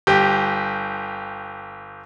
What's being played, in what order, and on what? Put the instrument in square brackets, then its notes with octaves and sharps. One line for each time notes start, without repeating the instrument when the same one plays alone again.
[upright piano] G1 G4